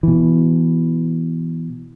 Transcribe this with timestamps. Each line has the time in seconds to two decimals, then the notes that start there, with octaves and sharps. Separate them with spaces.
0.03 B2 E3